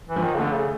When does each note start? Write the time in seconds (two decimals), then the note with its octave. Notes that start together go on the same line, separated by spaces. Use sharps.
0.08 E3
0.16 F3
0.24 D#3
0.35 C#3
0.39 D3 A3
0.55 C#3